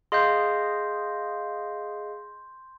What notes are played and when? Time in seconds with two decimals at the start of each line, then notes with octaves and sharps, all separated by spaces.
0.12 G#4 D#5 F5 C6 G6